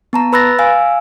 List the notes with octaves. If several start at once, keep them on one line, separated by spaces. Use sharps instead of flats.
B3 A5 A#5
B4 B5 E6 F#6 A6 A#6
F5 G#5 E6